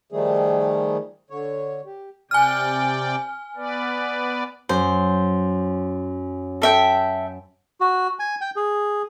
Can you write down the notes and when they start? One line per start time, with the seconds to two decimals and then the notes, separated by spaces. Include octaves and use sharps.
0.12 D#3 F3 G3 A3 G#4
1.30 D3 C#5
1.86 G4
2.31 C3 D5 G5 G#5 F6
3.56 B3 B4 D5
4.69 F#2 C5
6.62 A4 E5 G5
7.81 F#4
8.19 G#5
8.41 G5
8.56 G#4